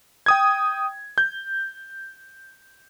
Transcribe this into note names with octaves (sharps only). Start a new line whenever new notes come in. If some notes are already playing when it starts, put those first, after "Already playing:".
G5 D#6 G#6
G6